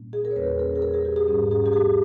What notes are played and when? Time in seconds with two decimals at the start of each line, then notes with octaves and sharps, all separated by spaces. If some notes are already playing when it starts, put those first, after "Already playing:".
Already playing: A#2 G3 A#3 C#4
0.13 G#4
0.25 A#4
0.31 C#5
0.36 E2 C#3 G3 A#3 C#4 B4
0.59 A#4
0.76 G#4
0.82 A#4
0.94 G#4
1.05 G4
1.16 G#4
1.28 G#2 G3 C#4
1.51 G#4
1.66 G4
1.73 G#4